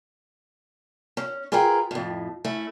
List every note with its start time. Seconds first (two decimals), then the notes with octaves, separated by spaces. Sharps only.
1.17 C#4
1.52 F4 G#4 A#4 B4 G5
1.91 F2 A2
2.45 A3 C#4 E4